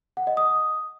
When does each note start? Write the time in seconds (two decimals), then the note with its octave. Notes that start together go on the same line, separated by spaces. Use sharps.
0.17 F#5
0.27 D#5
0.37 D#6